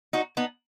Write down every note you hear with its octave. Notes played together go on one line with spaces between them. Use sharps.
D#4 F#4
B3 D#4